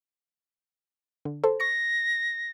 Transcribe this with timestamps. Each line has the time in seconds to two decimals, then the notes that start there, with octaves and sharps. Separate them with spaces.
1.25 D3
1.44 A4 C5
1.60 C#6 A#6 C#7